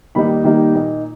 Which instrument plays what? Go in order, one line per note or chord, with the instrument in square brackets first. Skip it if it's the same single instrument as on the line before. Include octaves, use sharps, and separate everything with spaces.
[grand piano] D#3 G3 A#3 D#4 B5
D#3 G3 A#3 D#4
A#2 A#3 D#4